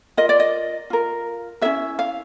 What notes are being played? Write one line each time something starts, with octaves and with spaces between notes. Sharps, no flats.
F4 A#4 D#5
D5
D#5
F4 A#4
C#4 E4 G#4 B4 E5
F5